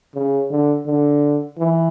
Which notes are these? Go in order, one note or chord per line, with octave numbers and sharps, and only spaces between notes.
C#3
D3
D3
E3